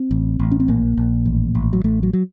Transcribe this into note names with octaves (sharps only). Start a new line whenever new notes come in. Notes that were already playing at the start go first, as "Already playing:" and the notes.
Already playing: C4
A1
A1
C#4
C4
A#1 A#3
A#1
A1
A1
F#3
A1 A3
F#3
F#3